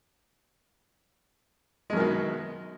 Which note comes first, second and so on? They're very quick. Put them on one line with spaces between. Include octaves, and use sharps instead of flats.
G#3 F#2 D#3 B2